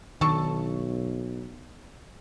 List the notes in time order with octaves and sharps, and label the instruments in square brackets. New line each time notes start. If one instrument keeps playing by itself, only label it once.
[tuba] B1 [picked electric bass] D#3 [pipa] D4 A4 C#6